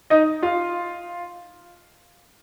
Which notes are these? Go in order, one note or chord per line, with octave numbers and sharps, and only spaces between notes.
D#4 D#5
F4 F5